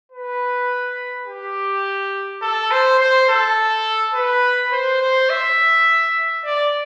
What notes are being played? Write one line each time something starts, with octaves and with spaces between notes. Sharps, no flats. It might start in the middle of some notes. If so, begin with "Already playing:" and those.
B4
G4
A4
C5
C5
A4
B4
C5
C5
E5
D5